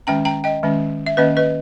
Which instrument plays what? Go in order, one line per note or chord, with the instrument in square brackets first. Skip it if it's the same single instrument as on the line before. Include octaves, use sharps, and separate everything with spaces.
[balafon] D#3 G#3 C#4 G5 A#5
G5 A#5
D#5 G5
D#3 G#3 C#4
E5
D#3 A#3 C#4 B4 D#5
B4 D#5